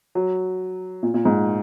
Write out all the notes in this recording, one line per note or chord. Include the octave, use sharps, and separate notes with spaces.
F#3
A#2
A#2
G#2